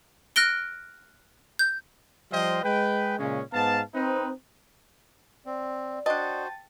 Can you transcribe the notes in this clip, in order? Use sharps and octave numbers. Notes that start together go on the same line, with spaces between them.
F6 F#6 A#6 D7 G7
G6
F3 G3 F4 C5 D#5 G5
G#3 B4 G5
A#2 C#3 G#3 C#4
G#2 B3 F5 A5
C4 D#4 B4
C4 D5
D4 F#4 C5 D#5 G5 A5 A6